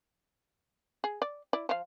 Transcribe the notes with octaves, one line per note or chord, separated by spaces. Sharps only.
G#4
D5
E4 D5
F3 F5